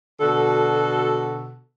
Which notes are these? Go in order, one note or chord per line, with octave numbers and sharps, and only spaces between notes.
B2 D3 F#4 A4